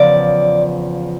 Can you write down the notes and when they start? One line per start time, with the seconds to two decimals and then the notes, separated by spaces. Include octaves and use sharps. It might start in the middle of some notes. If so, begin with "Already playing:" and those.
Already playing: E2 C#3 F3 D5